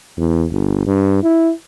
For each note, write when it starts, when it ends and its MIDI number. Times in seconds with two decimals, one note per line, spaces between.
0.17 0.45 40
0.52 0.86 31
0.87 1.20 43
1.23 1.52 64